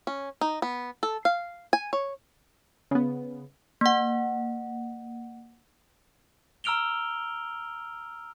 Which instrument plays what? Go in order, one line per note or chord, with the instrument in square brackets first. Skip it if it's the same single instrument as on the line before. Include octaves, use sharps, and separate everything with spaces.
[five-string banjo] C#4
D#4
B3
A4
F5
G#5
C#5
[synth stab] C#3 B3
[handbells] A#3 F#5
[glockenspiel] A#5 E6 F6 D7 F7 G7